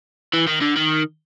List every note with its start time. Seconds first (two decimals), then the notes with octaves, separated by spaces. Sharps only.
0.34 E3
0.47 D#3
0.61 D3
0.76 D#3